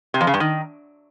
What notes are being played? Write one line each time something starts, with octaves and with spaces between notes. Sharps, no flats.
C3
F2
C#3
G2
D#3